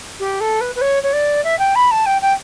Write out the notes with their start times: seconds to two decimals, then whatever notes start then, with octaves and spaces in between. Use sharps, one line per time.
0.19 G4
0.40 A4
0.60 B4
0.75 B4
0.81 C#5
1.03 C#5
1.13 D5
1.44 E5
1.59 G5
1.75 B5
1.91 A5
2.06 G5
2.21 G5